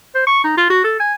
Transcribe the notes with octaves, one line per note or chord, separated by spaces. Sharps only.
C5
C#6
D#4
F4
F#4
A4
G#5